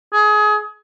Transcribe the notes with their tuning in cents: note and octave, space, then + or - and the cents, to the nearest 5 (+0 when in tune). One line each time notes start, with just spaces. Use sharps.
G#4 +25